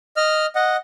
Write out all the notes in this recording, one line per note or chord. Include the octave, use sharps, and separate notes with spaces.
D#5 F6
D#5 F#5